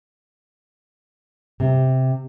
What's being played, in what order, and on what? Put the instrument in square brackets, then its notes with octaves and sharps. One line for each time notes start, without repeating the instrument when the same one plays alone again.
[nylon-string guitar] C3